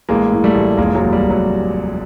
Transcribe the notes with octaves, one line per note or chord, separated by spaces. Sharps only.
A1 G#3 A#3
A2
G3 A3
A1
F1 G#3 A#3
F#3 G#3
D#2
G3
F1
F#3